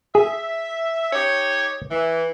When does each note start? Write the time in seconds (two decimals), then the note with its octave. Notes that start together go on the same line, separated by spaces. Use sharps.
0.15 G#4 E5
1.13 D#4 G4 C#5
1.91 E3